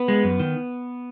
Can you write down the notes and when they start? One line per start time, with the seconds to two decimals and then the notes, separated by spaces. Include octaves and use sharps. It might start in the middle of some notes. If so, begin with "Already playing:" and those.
Already playing: B3 B4
0.08 G#3
0.24 F#2
0.40 D#3